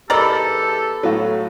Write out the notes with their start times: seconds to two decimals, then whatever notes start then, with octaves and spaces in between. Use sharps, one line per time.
0.10 E2 G4 A4 A#4 D5 D#5 B5 A6
1.03 A2 F#3 E4 A4 F5